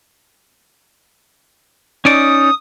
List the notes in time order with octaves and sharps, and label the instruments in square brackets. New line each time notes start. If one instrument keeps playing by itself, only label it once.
[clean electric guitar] C#4 D#4 D5 [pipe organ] D#6